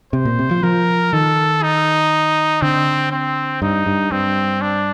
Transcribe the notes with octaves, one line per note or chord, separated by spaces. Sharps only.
C3 C5
A#2
C3
F3
F3 A#4
D#3 A4
D#4
D3 C4
C4
G2 D#4
G2
G2 C4
D4